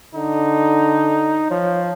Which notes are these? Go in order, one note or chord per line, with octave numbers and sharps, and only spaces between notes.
D3 D#4
F3 C#5